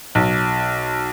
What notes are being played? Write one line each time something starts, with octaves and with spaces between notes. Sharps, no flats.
B1